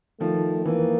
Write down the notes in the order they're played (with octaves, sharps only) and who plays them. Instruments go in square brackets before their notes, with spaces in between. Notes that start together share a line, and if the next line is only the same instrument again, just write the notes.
[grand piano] D#3 F3 [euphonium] A3
[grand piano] E3 [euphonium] A#3